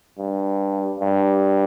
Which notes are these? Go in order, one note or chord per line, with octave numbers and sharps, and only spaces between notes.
G2
G2